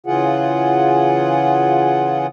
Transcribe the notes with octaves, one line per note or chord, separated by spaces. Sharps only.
C#3 E3 F4 G#4 F#5